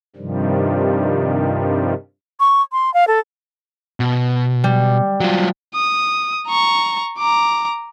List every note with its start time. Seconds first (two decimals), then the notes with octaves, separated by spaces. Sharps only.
0.16 G2 C3 D#3 F3 G3
2.40 C#6
2.72 C6
2.94 F5
3.08 A4
4.00 B2
4.64 G3
5.21 F#3 F4
5.75 D#6
6.48 A#5 C#6
7.18 A#5 D6